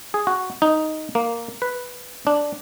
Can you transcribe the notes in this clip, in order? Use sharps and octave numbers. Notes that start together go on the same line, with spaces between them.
G#4
F#4
D#4
A#3
B4
D4